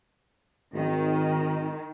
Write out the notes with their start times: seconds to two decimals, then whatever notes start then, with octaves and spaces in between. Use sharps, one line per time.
0.74 G#1 D#3